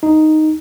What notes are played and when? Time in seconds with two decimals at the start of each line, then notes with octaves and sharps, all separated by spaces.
0.03 D#4